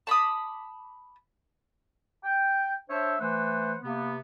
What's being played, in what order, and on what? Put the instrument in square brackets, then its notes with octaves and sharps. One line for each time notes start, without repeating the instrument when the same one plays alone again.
[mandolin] A5 B5 D6 D#6
[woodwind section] G5
D4 C5 C#5 E5
E3 A3 B4 C5 F#5
C3 A#3 B3